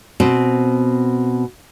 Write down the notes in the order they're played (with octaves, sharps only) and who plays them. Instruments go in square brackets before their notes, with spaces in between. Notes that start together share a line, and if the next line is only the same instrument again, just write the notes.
[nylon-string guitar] B2 C4